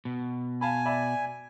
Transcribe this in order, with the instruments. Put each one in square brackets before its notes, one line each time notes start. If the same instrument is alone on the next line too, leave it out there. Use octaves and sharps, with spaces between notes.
[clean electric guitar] B2
[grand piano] F5 A5 B5 [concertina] G#5
[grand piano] D5 E5 B5